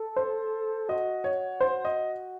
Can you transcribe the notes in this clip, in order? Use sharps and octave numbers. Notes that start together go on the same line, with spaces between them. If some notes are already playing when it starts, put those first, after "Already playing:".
Already playing: A4
C5
F#4 D#5
C#5
C5
D#5